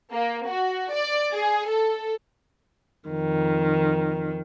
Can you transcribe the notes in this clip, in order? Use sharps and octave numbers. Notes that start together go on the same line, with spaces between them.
A#3
F#4
D5
G#4
A4
F2 D#3